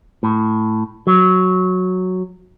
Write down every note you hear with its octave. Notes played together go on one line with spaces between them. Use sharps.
A2
F#3